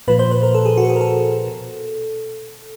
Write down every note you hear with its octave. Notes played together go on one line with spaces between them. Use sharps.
A#2 F3 B4
C5
B4
A#4
A4
G#4
F#4
A4
G#4
A#4
A4
B2